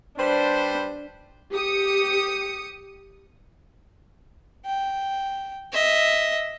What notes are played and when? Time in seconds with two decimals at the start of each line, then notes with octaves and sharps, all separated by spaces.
0.18 G3 D4 B4 C5
1.53 G4 D#6 C#7
4.66 G5
5.73 D#5 E5